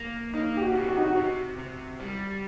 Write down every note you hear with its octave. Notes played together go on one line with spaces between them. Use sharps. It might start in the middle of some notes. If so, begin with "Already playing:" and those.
Already playing: A#3
A#3 D#4
G4
F#4
C3
F#4
D#4
F#4
C3
C3
G3